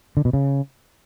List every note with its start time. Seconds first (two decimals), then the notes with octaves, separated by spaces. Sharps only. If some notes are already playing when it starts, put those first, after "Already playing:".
0.17 D3
0.25 B2
0.33 C#3